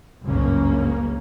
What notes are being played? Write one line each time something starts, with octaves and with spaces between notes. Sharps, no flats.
F#1 C#2 G2 C#3 A#3 C#4